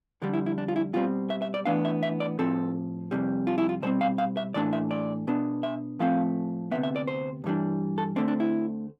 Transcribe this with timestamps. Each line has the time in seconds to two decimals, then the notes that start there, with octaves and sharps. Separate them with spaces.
0.22 F2 D3 G3 D4
0.34 E4
0.46 E4
0.58 D4
0.68 F4
0.76 E4
0.93 B2 G3 C4 F4
1.30 E5
1.42 E5
1.54 D5
1.66 A2 E3 B3 D4 F5
1.85 E5
2.03 E5
2.20 D5
2.39 A2 F3 C4 A4
3.11 F2 C3 G3
3.47 F4
3.58 E4
3.69 F4
3.82 B2 G3 C4 C5
4.01 F5
4.18 F5
4.37 E5
4.54 A2 E3 A3 D4 D5
4.73 E5
4.91 D5
5.27 B2 B3 D4
5.63 E5
5.99 A2 F3 A3 C4 F5
6.71 D2 C3 E3 B3 E5
6.83 E5
6.96 D5
7.07 C5
7.44 G2 E3 G3 D4
7.98 A4
8.16 D2 D3 A3 C4 D4
8.28 D4
8.40 E4